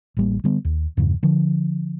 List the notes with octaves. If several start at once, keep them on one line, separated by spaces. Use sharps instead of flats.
A1 G3 A#3
D3 G3 B3
D#2
E2 G2 C#3
D3 F3